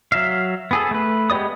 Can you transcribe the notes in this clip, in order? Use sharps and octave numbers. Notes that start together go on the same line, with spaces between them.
F#3 E5 F5
B3 G#4 A4
A3 B4
G#3 B3 G4 D5 D#6